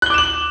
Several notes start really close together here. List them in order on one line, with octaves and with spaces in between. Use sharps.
F#6 G7 D6 E7 F#7